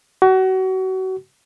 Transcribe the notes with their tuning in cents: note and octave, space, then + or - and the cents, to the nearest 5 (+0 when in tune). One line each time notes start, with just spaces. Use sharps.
F#4 +30